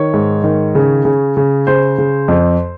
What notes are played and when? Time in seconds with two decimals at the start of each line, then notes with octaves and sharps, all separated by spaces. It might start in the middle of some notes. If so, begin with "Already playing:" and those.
Already playing: D#3 C#5
0.14 G#2
0.44 D#3
0.75 C#3
1.05 C#3
1.37 C#3
1.67 C#3 C5
1.98 C#3
2.28 F2